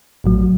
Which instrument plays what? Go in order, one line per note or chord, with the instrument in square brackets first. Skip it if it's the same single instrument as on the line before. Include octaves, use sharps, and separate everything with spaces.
[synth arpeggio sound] A1 A2 F#3